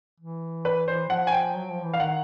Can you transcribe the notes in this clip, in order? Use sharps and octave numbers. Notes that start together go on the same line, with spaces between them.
E3
B4
C5
F3 F#5
G#5
G5
F#3
F3
E3
F5
D#3 F#5